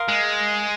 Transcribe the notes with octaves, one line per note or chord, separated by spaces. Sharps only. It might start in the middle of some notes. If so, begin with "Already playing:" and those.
Already playing: A#4 F5 C6 D#6
G#3